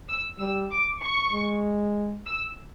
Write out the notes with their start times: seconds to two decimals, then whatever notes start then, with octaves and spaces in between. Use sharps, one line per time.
0.09 E6
0.40 G3 E6
0.71 D6
1.02 C#6
1.33 G#3
2.26 E6